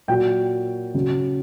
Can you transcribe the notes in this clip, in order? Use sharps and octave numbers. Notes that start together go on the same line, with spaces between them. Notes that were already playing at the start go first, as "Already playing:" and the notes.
A#2 F#3 G5
C#3 F#3